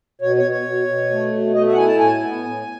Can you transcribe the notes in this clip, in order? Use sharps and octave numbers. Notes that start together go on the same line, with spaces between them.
B2 C#5
C#5
B2
C#5
B2
B2
A3
B2
A3 D#5
E5
F#5
E4 G#5
A5
A2 G#5
B3
A2